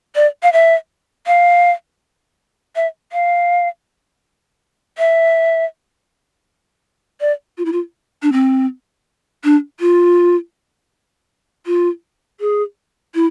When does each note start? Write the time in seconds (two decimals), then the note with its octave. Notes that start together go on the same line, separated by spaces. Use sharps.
0.15 D5
0.43 F5
0.53 E5
1.27 F5
2.76 E5
3.12 F5
4.98 E5
7.21 D5
7.58 F4
7.65 E4
7.72 F4
8.22 D4
8.32 C4
9.44 D4
9.80 F4
11.66 F4
12.40 G#4
13.15 E4